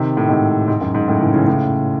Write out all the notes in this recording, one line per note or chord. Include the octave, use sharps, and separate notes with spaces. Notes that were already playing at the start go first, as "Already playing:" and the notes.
Already playing: C3 D#3
A2
G#2 C3
G#2
F#2
G#2
F#2 A2
C#3 E3
C#3 E3
A2 C#3